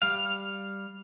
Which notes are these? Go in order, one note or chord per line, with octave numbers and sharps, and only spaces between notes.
G3 F5